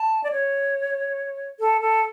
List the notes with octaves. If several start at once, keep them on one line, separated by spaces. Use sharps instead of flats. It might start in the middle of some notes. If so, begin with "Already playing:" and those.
Already playing: A5
D5
C#5
A4
A4